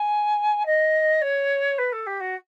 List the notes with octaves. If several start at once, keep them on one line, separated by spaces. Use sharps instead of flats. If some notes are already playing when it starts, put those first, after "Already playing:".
Already playing: G#5
D#5
C#5
B4
A4
G4
F#4